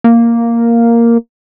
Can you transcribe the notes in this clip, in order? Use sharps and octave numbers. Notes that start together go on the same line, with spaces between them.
A#3